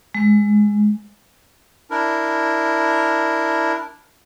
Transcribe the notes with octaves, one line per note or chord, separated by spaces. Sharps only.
G#3
D4 E4 A#4